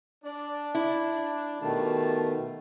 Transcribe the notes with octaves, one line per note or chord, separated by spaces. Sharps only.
D4 D5
E4
B2 D#3 A3 F4 G4 A5